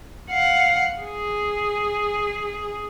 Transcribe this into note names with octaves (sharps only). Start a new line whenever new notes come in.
F5 F#5
G#4